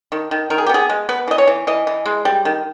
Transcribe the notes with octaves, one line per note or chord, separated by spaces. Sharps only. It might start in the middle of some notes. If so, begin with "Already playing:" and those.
D#3
D#3
D#3 A#4
G#4
G4
B3 G#4
G#3
B3 B4
E3 D#5
C#5
E3
E3 D#5
E3
G#3
G3
D#3